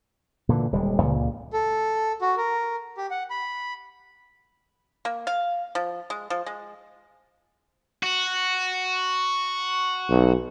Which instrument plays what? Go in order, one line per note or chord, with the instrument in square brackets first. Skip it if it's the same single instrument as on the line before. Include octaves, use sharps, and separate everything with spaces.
[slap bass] A#2 D3 E3
D#1 G3 G#3
C#2 A#2 C#3
[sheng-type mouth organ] A4
F#4
A#4
G4
F#5
B5
[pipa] A#3
F5
F3
G#3
F3
G#3
[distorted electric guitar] F#4
[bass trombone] B1